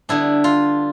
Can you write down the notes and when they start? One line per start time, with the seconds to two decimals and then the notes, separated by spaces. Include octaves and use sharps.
0.09 D3 G3 B3 D4 E4
0.44 F4